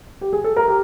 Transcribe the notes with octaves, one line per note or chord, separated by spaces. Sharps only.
G4
G#4
A4
A#4
G4